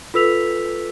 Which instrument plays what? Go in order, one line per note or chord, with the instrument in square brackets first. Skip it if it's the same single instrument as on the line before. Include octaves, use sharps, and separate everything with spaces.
[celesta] F4 A4 B4 E6 B6 F7